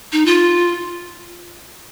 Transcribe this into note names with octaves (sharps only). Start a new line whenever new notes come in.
D#4
F4